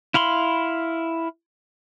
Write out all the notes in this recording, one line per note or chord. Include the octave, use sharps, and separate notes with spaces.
E4 F5 B5 C6